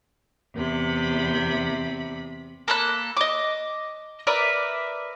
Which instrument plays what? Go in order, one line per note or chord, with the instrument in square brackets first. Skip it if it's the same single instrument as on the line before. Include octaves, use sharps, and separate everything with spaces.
[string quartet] E2 C3 B5
[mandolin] A#3 A4 B5 F#6
D#5 D6
A#4 B4 D5 E5